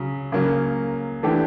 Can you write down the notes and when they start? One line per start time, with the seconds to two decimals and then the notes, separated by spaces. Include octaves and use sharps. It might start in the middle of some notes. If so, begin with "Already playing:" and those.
Already playing: C#3 F#3
0.32 C#3 F#3 A#3
1.23 E3 A3 D4 G4